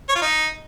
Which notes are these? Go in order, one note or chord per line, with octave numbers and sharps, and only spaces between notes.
C#5
F4
D#4